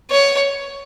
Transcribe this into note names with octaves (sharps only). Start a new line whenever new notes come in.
C#5